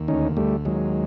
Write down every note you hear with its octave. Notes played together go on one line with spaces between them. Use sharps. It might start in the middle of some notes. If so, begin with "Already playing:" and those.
Already playing: D#2
D2 C#4 D#4
D2 G3 A3
D#2 F#3 G#3